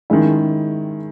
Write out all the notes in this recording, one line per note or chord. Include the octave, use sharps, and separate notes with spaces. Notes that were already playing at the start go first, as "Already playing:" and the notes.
D#3 G#3 C#4 E4